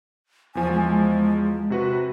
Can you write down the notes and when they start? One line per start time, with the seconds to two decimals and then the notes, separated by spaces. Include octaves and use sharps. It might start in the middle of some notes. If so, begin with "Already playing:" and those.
0.55 E2 F3 G#5
0.72 G#3
1.70 C3 F#4 B4